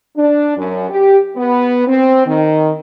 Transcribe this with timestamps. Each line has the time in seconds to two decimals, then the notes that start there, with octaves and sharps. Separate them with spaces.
0.17 D4
0.57 F#2
0.90 G4
1.36 B3
1.87 C4
2.26 D#3